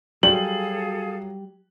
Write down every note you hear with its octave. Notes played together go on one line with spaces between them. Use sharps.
F#3 G3 G#4 A4 F5 F#7